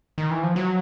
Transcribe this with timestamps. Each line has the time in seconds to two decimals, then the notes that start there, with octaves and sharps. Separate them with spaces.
0.18 D#3
0.31 E3
0.43 F3
0.56 F#3